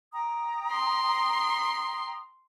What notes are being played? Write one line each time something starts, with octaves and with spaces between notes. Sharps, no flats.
G5 A#5 D#6
C6